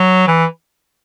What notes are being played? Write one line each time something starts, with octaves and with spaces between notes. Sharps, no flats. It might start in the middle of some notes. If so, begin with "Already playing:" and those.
Already playing: F#3
E3